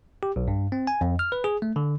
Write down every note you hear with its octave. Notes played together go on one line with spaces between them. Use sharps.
G4
B1
G2
C4
G#5
F2
F6
B4
G#4
A3
D3